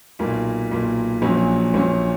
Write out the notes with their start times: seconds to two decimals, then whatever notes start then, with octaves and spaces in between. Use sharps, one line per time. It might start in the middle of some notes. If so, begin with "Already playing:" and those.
0.19 B1 A#2 A#3
0.71 B1 A#2 A#3
1.22 A#1 A#2 F#3 C#4
1.74 A#1 A#2 F#3 C#4